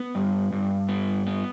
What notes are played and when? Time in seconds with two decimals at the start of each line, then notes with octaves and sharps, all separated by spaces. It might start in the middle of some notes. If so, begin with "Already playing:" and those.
Already playing: B3
0.15 G2
0.52 G2
0.88 B3
1.27 B3